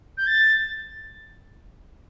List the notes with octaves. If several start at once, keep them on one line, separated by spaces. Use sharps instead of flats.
G6
A6